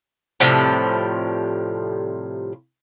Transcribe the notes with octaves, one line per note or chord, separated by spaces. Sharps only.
A2 C3 F3 G3